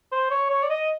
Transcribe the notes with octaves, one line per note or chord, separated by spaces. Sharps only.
C5
C#5
C#5
D5
D#5